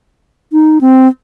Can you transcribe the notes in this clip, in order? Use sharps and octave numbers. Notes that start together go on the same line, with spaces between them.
D#4
C4